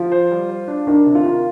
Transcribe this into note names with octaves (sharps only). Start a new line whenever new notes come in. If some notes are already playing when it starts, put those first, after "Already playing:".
Already playing: F3 F4
C5
G3
C5
D4
D#3 D4
C3
F4
D#3